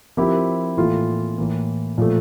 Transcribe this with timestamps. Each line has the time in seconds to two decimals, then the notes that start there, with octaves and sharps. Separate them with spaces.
0.17 F3 C4 E4 G4 A#4
0.77 A2 E3 A#3 F4 A4
1.38 A2 E3 A#3
1.98 A#2 F3 A3